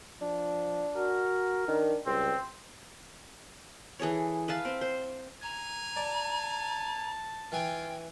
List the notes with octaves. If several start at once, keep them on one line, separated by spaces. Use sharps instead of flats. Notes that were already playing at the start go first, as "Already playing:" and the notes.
F3 D4
F#4 A#4
D#3 D4
C#2 G3 C4
E3 G#4 A4 C#5
B4 E5 F5 A5
C4
C5
G#5 A#5
D5 A5
E3 F4 G5 G#5